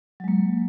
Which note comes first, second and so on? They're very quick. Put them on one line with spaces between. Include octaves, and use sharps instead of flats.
F#3 G#3 A#3